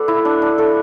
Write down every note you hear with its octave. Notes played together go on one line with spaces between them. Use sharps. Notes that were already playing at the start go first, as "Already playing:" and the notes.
Already playing: A3 A4 B4 D5 F#5
E4
D4
D4
A3 A4